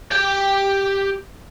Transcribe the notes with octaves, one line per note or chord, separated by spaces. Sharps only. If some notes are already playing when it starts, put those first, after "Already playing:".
G4 G5